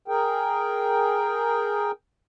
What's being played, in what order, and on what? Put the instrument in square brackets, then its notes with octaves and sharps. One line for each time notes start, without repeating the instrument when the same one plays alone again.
[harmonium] G#4 A#4 G5